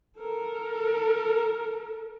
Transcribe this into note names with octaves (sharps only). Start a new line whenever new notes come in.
A4 A#4